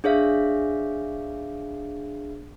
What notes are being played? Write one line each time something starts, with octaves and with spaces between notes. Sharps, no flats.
D4 G#4 C#5 E5 F5